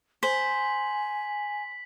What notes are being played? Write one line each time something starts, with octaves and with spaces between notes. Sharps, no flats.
C5 G#5 B6 F#7